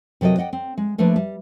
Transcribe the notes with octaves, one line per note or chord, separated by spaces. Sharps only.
C3 F#3 A4 A#4 D#5
D5 D#5 F#5 G5
C4
G#3
F3 A3 A#3 D4 B4
G3